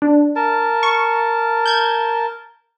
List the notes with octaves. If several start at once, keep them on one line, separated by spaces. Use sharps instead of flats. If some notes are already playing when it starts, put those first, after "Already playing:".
D4
A#4 A5
C#6
G6 G#6